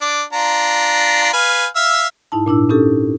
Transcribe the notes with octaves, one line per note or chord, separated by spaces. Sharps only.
D4 D6
D4 F4 A#5
B4 F5 G#5
E5 F5 E6
G#2 D#4 E4 A5
A#2 D4 E4 E6
C#4 D#4 G4 A4